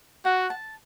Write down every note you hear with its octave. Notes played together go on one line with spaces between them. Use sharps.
F#4 F#5
A5